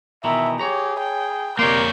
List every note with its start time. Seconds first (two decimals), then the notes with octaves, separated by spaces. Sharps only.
0.24 B2 D#3 E3 E5 A#5
0.59 G4 G#4 C#5 A#5
1.00 G5
1.59 C3 A#3 A#4 C#5 D5 C6 G6